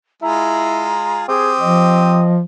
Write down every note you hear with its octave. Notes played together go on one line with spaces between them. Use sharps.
G#3 E4 F4 G#4 A#5
C4 G4 G#4 D#6
F3 D#5